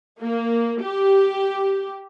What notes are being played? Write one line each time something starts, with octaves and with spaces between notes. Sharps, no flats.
A#3
G4